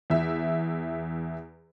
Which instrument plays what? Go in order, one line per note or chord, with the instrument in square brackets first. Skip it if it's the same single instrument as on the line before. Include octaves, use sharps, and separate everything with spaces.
[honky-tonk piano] E2 E5